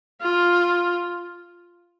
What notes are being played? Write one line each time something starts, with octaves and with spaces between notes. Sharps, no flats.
F4